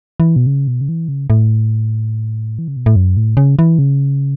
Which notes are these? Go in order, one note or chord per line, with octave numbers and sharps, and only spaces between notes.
E3
B2
C#3
B2
C#3
E3
C#3
A2
E3
C#3
B2
A2
F#2
A2
C#3
E3
C#3